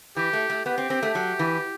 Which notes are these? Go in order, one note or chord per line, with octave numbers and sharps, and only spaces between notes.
E3 G4
A3
A3
B3 G4
C4
C4
A3
F#3
E3